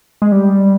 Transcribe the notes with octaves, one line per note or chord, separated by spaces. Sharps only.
G#3
G3